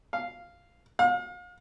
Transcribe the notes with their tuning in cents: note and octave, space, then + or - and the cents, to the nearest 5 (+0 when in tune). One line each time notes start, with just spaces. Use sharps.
F5 -5
F5 +40